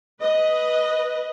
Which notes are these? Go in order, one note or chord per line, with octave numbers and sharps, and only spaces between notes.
B4 D#5